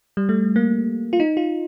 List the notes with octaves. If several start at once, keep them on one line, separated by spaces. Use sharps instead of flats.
G3
A3
A#3
F4
D#4
F4